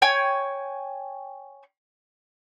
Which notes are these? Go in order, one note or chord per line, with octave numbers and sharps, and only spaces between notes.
C#5 G5 G#5